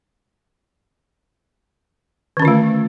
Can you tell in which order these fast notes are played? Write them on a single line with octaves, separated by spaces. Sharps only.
D#3 C#4 D3 F4 A3